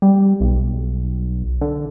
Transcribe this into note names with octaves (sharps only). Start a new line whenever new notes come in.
G3
B1
D3